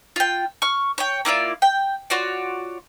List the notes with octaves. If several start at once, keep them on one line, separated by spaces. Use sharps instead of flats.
F4 G5
C#6 F6
C#5 G5
A#3 E4 F4 D5
G5
F4 F#4 C#5 D5